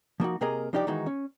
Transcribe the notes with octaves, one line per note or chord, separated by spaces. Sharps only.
F3 A#3 D#4 F#4
C3 A#3 G#4 A#4 D#5
F3 D4 D#4 G4 D5
D#3 E3 G#3 D#4 F#4
C#4